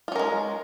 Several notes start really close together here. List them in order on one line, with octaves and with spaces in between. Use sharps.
F4 C#4 A#4 G#3